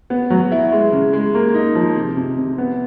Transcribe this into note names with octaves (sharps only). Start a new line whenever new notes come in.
B3
F#3
E4
G#3
C#3
G#3
A#3
D#4
F3
C3
C3
C3
B3